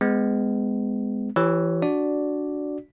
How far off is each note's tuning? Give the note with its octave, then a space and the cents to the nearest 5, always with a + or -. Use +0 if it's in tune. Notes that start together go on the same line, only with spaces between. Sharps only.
G#3 +0 B3 +35
E3 +35 G4 +0 C#5 +0
D4 -5 F#4 +0 D5 +0